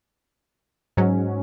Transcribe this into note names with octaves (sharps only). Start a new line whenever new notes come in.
G#2 F#3 C#4